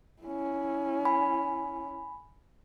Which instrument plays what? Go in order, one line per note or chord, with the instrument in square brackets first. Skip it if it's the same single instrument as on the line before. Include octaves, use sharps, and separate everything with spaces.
[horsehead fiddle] C#4 E4
[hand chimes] G#5 B5